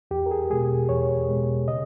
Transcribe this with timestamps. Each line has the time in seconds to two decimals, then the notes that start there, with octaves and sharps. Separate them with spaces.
0.11 E2 G4
0.26 A#4
0.31 G#4
0.50 B2 G#3 G#4
0.89 E2 C#5
1.29 B2 G#3
1.67 C#3 D#5